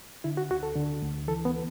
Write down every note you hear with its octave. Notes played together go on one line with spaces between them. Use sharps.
D3 E4
F#4
D2 F#4
A4
D3
D2
E3 A4
B3